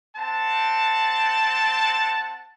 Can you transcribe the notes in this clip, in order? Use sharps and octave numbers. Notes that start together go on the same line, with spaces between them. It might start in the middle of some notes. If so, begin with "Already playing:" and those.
C4 F#5 A5